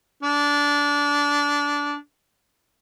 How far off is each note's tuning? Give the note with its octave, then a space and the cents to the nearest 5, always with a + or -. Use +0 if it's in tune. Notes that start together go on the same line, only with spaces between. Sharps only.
D4 -20